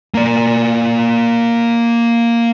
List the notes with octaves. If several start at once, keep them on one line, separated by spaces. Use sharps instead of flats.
A#3 D5